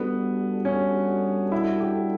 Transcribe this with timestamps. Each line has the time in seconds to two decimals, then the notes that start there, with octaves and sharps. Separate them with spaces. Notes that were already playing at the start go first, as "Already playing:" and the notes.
Already playing: G3 B3 D4 F#4 A4
0.65 C#4
1.52 E4
1.80 G4